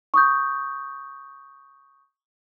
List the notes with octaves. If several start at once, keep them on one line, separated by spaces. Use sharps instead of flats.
C#6 D#6 G6